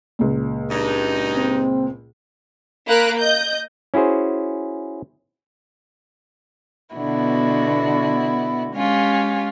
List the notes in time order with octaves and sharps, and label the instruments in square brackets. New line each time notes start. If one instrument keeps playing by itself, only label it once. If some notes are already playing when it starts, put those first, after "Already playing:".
[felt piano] C#2 A#2
[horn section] G2 D#4
[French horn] C4
[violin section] A#3 B5 F#6 D7
D#5 G6
[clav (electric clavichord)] C#4 E4 F#4 G#4 C5
[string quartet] B2 D3 B3 E4 F#4
G#3 C#4 F4 G4